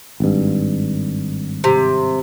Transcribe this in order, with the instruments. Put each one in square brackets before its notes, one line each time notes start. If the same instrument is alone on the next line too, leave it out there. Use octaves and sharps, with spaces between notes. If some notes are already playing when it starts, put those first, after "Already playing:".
[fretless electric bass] G#1 G2
[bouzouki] C3